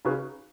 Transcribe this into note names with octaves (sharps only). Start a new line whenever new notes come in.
C#3 D#4 F#4 B4